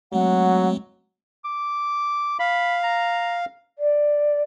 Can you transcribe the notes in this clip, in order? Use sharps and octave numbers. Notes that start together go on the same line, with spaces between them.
F#3 G#3 A3 C4 F#5
D6
F5 B5
A#5
D5